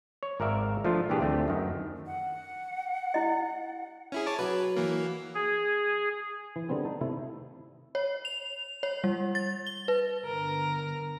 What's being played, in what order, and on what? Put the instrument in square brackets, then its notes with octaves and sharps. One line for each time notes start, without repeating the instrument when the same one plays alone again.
[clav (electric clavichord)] C#5
G#1 A#4 D5 E5 F5
F3 A3 D4 F4
A#2 E3 D4 G4 G#4
D2 A3 C4
F#2 D#3
[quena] F#5
[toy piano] E4 D#5
[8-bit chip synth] C#4 E4 G#4
C#5 A5 D6
[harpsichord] F#3 [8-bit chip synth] B4
[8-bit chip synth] E3 A#3
[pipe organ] G#4
[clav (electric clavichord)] E3
D3 G3 B3 C4 G#4
D#4 A5
C3 D#3 A3 E4
[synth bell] C#5
F7
C#5
G3
A6
G7
B4
[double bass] G1 D3 [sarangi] A#4